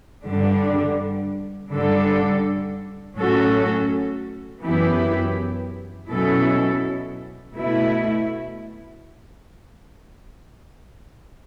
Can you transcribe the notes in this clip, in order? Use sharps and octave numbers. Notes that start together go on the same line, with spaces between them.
G2 D3 G3 D4
G2 D3 G3 D4 A4
A2 F#3 C#4 F#4 A4
F#2 E3 B3 E4 G4
B2 F#3 C#4 E4 A4
B2 A3 E4